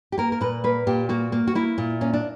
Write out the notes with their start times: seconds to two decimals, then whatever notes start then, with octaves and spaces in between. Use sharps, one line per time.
0.12 G4
0.18 A#3 A#4
0.32 A#4
0.41 A#2 B4
0.64 A#3 B4
0.87 A#2 G4
1.09 A#3 F#4
1.32 A#3
1.47 F#4
1.55 A#3 E4
1.78 A#2
2.01 A#3 C#4
2.13 D4